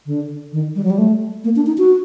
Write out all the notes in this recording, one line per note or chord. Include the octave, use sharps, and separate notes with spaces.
D3
D#3
G3
F#3
G3
A3
A#3
D4
D#4
F#4